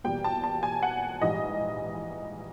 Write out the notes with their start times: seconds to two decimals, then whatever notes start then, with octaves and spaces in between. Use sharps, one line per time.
0.04 E2 B2 G3 A#3 G5
0.24 A5
0.44 A5
0.63 G#5
0.83 F#5
1.22 A#1 G#2 E3 G3 D#5